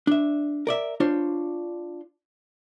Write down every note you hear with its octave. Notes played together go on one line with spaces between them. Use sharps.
D4 E5
A#4 D5 E5
D4 F4 C5 C#5